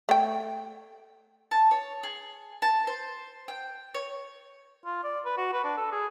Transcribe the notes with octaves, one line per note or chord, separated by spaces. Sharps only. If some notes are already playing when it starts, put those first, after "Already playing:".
A3 G5
A5
C#5
G#4
A5
C5
G5
C#5
F4
D5
B4
F#4
B4
D4
A4
G#4